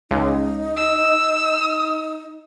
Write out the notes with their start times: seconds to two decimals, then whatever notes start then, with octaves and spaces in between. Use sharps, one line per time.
0.11 C#2 D#4
0.77 E6